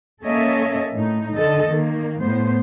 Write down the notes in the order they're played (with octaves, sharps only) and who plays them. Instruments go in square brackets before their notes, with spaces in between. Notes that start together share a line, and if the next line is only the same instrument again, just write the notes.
[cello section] A#3 C#4 A4 C#5 D#5 E5
A2 D#4
D3 A4 D#5
D#3 A#3
A2 B3 C5